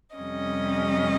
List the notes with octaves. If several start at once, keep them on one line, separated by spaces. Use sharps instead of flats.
F2 C3 G3 C#4 D#5